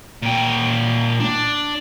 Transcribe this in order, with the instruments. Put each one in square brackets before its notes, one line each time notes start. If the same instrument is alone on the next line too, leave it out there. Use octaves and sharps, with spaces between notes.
[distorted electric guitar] A#2 G5
D4